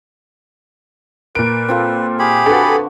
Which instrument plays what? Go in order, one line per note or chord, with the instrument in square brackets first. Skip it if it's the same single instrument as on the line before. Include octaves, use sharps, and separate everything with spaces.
[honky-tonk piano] A#2 D7 [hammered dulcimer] A#4 [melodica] B4
[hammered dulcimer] C4 F4 A4
[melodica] G4 G#4 B5
[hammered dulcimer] D3 F#4 [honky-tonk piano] A4 B4